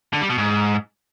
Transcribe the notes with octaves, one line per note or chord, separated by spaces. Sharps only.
D3
G3
B2
G#2